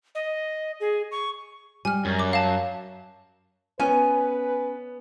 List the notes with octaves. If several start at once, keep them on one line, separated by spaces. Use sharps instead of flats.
D#5
G#4
C#6
G3 G#5 F6
F#2
D6
F5 A5
B3 C#4 B4 G#5